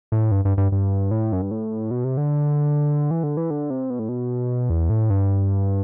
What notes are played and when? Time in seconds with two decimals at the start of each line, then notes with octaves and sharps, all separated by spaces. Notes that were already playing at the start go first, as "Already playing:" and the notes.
0.12 A2
0.31 G2
0.45 G2
0.58 G2
0.72 G2
1.11 A2
1.33 F#2
1.42 G2
1.51 A2
1.91 B2
2.04 C3
2.17 D3
3.11 E3
3.23 D3
3.37 E3
3.51 D3
3.70 C3
3.90 B2
3.99 A2
4.09 B2
4.70 E2
4.90 A2
5.10 G2